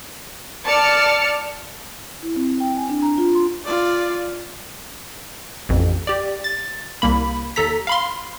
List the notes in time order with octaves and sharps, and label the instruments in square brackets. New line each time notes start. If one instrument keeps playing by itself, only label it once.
[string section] D5 A5 F6 C#7
[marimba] E4
C4
G5
G#5
D4
A#5
F4
C6
[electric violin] F4 D5
[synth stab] A1 F2
G4 D5
A6
C2 A#3 B5
D#2 A4 A#5 B6
F5 B5 C6